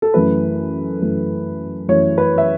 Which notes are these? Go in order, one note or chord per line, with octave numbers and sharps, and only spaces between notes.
A4
F#2 E3 A3 B4
F#2 E3 A3
F#2 E3 A3 C#5
B4
E5